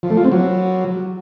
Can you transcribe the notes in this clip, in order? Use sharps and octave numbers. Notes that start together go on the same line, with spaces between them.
F3
A3
F4
C4
F#3